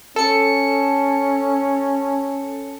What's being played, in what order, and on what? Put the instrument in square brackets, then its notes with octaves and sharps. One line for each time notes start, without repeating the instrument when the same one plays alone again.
[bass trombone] C#4 [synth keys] A4 C#7